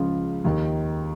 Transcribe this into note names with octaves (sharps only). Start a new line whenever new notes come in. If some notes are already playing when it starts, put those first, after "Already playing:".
Already playing: C#2 C#3 F3 F4
D#2 D#3